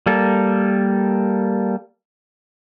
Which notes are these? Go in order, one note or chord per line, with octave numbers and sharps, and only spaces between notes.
G3 A#3 A4